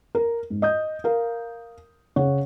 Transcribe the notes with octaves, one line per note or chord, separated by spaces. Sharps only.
A#4
G#2
D#5 D#6 G6
A#4 F5
C#3 C#5 F#5